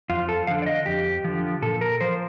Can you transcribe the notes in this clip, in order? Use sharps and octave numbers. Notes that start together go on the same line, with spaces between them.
F2 F4
A4
D3 F3 F5
D5
D#5
F2 G4
D3 F3
A#2 A4
A#4
F3 C5